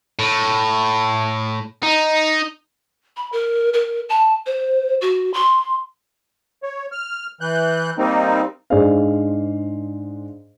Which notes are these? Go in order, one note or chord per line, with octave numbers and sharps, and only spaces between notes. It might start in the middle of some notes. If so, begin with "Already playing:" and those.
A2
D#4
B5
A#4
A#4
A5
C5
F#4
C6
C#5
F6
E3 F#6 G6
G3 A#3 C4 D#4
G#2 D4 G#4 C5 D5 F5